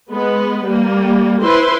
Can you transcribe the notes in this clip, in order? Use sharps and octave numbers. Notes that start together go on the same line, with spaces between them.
G#3 B3 B4
G3 A#3
E4 B4 C5 C6